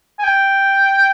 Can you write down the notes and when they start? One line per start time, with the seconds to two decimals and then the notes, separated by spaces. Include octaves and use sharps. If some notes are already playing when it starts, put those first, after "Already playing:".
0.19 G#5
0.23 G5